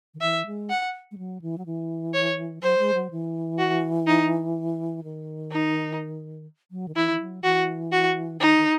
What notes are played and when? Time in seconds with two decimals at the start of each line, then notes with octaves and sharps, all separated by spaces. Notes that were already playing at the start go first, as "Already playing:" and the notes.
0.14 D#3
0.21 E3 E5
0.46 G#3
0.69 F#5
1.11 G#3
1.18 F#3
1.42 E3
1.58 F#3
1.66 E3
2.14 C#5
2.62 F#3 C5
2.78 G#3
2.94 F#3
3.11 E3
3.58 F#4
4.07 D#4
5.04 D#3
5.51 D#4
6.71 F#3
6.88 D#3
6.95 E3 E4
7.11 E3
7.20 F#3
7.43 E3 F#4
7.92 F#4
8.40 D#3 D#4
8.58 D#3